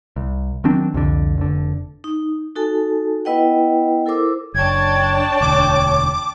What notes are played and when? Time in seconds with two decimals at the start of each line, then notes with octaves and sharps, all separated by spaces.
0.16 C2
0.64 D#3 F#3 C4 D4
0.94 C2 F2 D3
1.38 F1 D3
2.04 D#4
2.56 D#4 F#4 A4 G#5 A5
3.25 B3 E4 B4 D#5 F#5 G5
4.06 E4 A4 A#4 C5 D6 E6
4.54 F#1 D4 C#5 G5 A5 G#6
5.41 E1 D2 D6